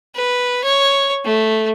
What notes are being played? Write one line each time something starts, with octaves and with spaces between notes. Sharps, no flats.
B4
C#5
A3